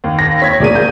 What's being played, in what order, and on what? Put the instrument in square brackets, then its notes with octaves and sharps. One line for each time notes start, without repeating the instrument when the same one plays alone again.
[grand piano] D#2
[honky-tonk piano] A#6
[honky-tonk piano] C#5 C#6 [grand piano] G#6 B6
[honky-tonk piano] D2 A#3 G#4 [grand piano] D5 D#7
[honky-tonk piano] G#4 G6 G#6